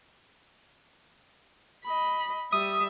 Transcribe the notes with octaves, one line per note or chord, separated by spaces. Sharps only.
D#5 B5
G3 E5 D#6